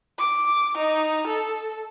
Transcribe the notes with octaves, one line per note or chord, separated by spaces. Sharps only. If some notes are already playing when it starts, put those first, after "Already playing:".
D6
D#4
A4